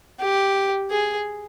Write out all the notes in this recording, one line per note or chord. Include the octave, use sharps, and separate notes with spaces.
G4
G#4